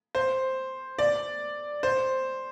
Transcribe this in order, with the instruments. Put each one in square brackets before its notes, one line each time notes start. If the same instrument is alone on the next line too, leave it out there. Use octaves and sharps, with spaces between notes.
[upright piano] C5
D5
C5